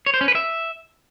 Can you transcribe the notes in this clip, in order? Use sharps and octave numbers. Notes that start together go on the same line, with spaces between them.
C#5
C5
C#4
B4
E5